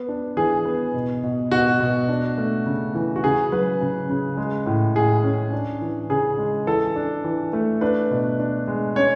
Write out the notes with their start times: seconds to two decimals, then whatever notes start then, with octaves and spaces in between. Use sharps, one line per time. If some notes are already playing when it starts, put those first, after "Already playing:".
Already playing: B3
0.09 D4
0.37 E3 G#4
0.65 B3
0.94 B2
1.23 B2
1.51 B2 F#4
1.80 B2
2.08 D4
2.38 A3
2.66 C#3
2.95 E3
3.16 F#4
3.24 C#3 G#4
3.52 F#3 B4
3.81 C#3
4.10 C#3
4.37 G#3
4.66 A2
4.95 A2 G#4
5.24 C#4
5.53 D4
5.81 E3
6.09 C#3 G#4
6.38 G#3
6.67 E3 A4
6.96 D4
7.24 E3
7.53 A3
7.81 D4 B4
8.11 B2
8.39 D4
8.68 G#3
8.96 C#4 C#5